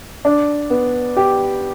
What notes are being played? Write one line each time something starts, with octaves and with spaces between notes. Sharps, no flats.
D4
B3
G4